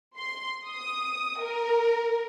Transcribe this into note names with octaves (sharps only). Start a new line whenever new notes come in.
C6
D#6
A#4